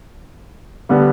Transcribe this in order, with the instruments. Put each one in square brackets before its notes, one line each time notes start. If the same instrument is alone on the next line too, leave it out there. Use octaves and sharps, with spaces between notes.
[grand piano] D3 G3 B3